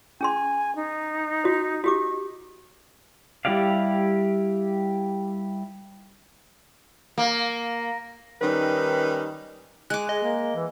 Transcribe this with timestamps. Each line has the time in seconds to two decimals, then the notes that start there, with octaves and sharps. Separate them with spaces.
0.21 C#4 G#4 G#5 C6
0.76 D#4
1.44 F#4 C5
1.84 F#4 G4 D6
3.45 G3 E4 G4 D5 F5
7.18 A#3
8.42 D#3 G3 C#4 D#4 B4
9.90 G#3 D6 F#6
10.09 G#4 D#5
10.23 A#3
10.55 E3